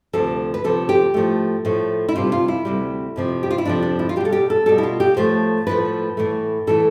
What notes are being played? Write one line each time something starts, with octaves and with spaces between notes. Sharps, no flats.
D2 C3 F3 A4
B4
D2 C3 F3 A4
G4
A2 F3 A3
A2 F3 A3
E4
D2 C3 G3 F4
F4
E4
D2 C3 G3
F2 C3 F3
G4
F4
E4
F2 C3 F3 D4
D4
E4
F4
B2 G3 G4 A4
G4
A4
B2 G3 A4
E4
F4
G4
A2 F3 A3 C5
A2 F3 A3 B4
A2 E3 A3
A2 E3 A3 A4